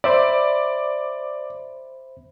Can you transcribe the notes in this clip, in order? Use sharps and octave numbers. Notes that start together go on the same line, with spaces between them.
C5 D5 E5 B5